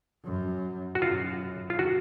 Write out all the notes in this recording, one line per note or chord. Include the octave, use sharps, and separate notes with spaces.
F#2
F#4
F#2 F4
F4
F#4